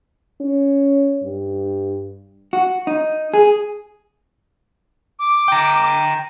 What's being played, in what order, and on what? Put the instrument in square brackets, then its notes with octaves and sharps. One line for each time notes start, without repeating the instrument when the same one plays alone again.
[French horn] C#4
G2
[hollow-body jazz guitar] F#4
D#4
G#4
[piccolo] D6
[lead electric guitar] G5 A#5